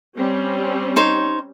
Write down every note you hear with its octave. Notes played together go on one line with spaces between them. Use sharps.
G3 C4 C#4
D#4 C5 C#5